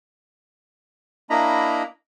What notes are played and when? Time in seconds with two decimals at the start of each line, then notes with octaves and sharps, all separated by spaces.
1.30 A#3 D4 E4 D#5 A#5 B5